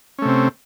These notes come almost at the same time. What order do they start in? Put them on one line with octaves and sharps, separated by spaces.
C#4 A3 C3 C4